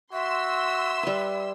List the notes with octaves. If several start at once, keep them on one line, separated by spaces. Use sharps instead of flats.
F#4 E5 C6 E6
G3 B4